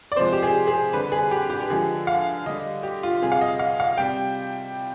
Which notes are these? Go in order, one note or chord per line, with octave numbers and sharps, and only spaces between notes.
D5
C3 F3 G#3 C5
G4
G#4
G#4
D3 G3 B4
G#4
G4
G4
G4
D3 F3 G#3 G#4
F5
D3 G3 D#5
G4
F4
C3 G3 G#4
F5
D#5
F5
F5
C3 G3 G5